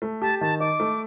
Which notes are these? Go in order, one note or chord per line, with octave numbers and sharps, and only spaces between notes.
A3
G4 A5
D#3 A5
D#4 D6
A3